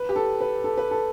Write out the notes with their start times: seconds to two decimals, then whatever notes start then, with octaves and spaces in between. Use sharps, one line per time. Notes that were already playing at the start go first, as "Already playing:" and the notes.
Already playing: B4
0.09 G4
0.16 A4
0.41 B4
0.64 A4
0.78 B4
0.91 A4